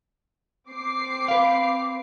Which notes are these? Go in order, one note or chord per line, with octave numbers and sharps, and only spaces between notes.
C4 D6 C7
B4 F5